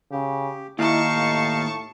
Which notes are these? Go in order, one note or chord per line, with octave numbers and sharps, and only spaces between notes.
C#3 G4
D#2 D#4 E4 F5 A5 C#6
A2